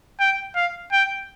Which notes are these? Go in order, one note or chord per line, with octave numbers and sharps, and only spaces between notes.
G5
F5
G5